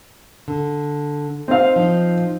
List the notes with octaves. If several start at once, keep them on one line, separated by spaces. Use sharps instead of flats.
D3
C4 D#4 F5
F3 D#4